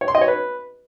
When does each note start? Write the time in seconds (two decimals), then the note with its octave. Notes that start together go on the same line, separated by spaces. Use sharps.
0.01 C#5
0.08 C6
0.15 D#5
0.21 C#5
0.28 B4